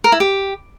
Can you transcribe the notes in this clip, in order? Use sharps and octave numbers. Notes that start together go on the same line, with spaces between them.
A#4
E4
G4